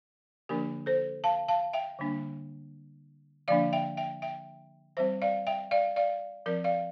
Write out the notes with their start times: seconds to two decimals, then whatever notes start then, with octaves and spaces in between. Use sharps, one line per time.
0.49 D3 F3 A#3 D4 G4 A#4
0.86 A4 C5
1.24 F5 A5
1.49 F5 A5
1.73 E5 G5
1.99 D3 G3 A#3 D4
3.48 D3 F3 A#3 D4 D5 F5
3.73 E5 G5
3.97 E5 G5
4.22 E5 G5
4.97 E3 G3 C4 C5 E5
5.22 D5 F5
5.47 E5 G5
5.71 D5 F5
5.96 D5 F5
6.46 F3 C4 A#4 D5
6.64 D5 F5